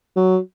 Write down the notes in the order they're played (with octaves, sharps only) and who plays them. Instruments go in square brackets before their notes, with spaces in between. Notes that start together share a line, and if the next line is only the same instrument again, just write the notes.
[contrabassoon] F#3